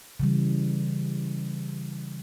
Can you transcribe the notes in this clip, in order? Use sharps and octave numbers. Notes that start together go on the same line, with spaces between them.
C#3 E3 G3